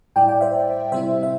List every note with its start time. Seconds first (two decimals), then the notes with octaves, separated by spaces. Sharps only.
0.16 A2 G3 E4 D5 G5
0.28 D5 G5
0.41 C5 E5
0.92 C3 G3 C4 E4 C5 E5
1.23 E5